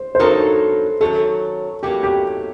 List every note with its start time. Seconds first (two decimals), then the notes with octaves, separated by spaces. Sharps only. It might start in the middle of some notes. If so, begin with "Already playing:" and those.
Already playing: C5
0.15 C5
0.19 G2 F#3 C4 D#4 A4 A#4
1.01 F#2 D#3 F#3 A4
1.83 A2 F#3 A#3 F#4 G4
2.03 G4